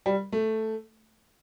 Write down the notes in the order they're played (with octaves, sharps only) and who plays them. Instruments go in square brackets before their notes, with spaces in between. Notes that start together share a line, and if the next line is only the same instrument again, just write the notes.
[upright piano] G3
A3